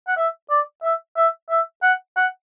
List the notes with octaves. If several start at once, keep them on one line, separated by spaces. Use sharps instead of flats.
F#5
E5
D5
E5
E5
E5
F#5
F#5